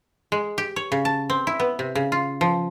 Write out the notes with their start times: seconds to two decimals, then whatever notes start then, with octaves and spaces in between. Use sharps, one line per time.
0.32 G#3
0.58 G4
0.76 C#5
0.92 C#3
1.05 A5
1.30 C4
1.47 E4
1.60 B3
1.79 C3
1.95 C#3
2.12 F4
2.41 F3